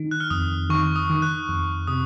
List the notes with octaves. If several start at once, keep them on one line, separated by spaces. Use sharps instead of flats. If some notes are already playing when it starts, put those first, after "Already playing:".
Already playing: D#3
F#6
F6
F2 D#6
D#3 C#6
D#6
D#3
F#6
F2
C3 D#6